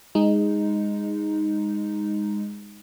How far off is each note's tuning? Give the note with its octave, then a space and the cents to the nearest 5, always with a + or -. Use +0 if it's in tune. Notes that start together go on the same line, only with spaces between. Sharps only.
G#3 -15 D#4 +0